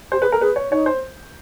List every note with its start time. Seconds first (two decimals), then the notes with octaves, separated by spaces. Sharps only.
0.12 G4 C5
0.22 G#4 B4
0.31 A4 A#4
0.41 G#4 B4
0.56 C#5
0.71 D#4 C#5
0.86 C5